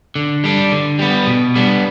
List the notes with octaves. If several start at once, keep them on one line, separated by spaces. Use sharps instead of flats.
D3
G3 D4
D3
G3 B3
B2
G3 B3 D4